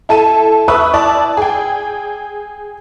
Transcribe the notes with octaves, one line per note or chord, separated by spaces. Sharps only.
E4 A4 A5 D#7
B4 E5 C#6 D#6 E6 F#6
E4 D5 A5
G#4 G5